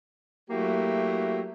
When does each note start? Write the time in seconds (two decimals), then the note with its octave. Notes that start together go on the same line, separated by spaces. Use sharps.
0.50 F#3 A3 A#3 E4 F#4 G4